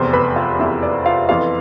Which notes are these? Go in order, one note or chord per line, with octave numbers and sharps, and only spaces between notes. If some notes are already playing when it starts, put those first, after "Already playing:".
Already playing: F1 E2 C3 C5 C6
B4 B5
F4 F5
F1 E2 C3 E4 E5
D5
F4 F5
F2 E3 B3 F4 F5